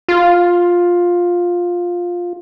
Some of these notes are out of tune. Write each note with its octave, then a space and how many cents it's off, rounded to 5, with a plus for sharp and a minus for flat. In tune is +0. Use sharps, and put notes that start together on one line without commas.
F4 +10